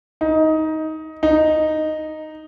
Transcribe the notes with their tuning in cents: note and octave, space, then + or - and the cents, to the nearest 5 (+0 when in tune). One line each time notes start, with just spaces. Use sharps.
D#4 +15
D#4 -5